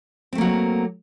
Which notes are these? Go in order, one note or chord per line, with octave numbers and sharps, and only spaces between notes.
F#3 A3 A#3 C4